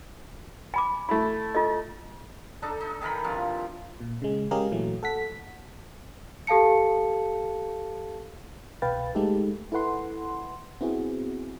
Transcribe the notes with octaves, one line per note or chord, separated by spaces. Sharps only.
G#5 B5 D6
A3 E4 B5
F4 A4 D#5
D4 D#4 A4
D#4
D#3 E3 A#4 B5
G2 C3 F3 F4
A#2
C#3 G#3
G#3 C#4 G4 G#4 A#4 F5
A#2 E3 F#3 A3
A4 F#5 B6
G4 A4 F5 A5 C#7
C2 B2 B4 F5 G5 A6
G#3 A3 D#4 G4 A4
E4 A4 B4 F#5 C6
B3 C4 E4 F#4 G#4